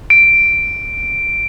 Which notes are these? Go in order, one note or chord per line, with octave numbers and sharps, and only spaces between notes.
D7